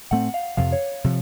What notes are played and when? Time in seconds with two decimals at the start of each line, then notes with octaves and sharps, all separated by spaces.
0.11 A2 A3 C4 F#5
0.34 F5
0.57 F2 C3 F3 F5
0.72 C#5
1.04 C3 F3